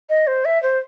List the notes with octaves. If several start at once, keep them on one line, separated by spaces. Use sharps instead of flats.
D#5
C5
E5
C5